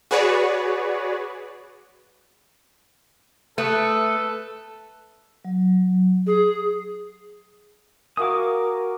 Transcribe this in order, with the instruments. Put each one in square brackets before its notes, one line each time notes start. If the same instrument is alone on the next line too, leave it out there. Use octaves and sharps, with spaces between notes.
[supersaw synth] F#4 G#4 B4 C#5 D5
[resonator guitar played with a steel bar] A3 [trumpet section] A4 [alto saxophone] B4 [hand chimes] D#6 F#6
[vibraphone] F#3
[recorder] G#4
[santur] F#4 F5 G#5 [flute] A#4 [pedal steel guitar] D6 D#6